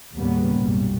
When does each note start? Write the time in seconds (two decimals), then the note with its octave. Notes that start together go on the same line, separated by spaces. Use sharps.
0.17 D#2 A2 C#3 G3 A#3 B3
0.60 B1 F#2 A#2 G3